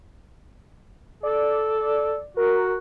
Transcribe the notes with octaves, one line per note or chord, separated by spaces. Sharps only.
A4 D5
F#4 A#4